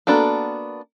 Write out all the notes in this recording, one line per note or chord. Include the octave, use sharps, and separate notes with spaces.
A#3 B3 D4 F#4 A4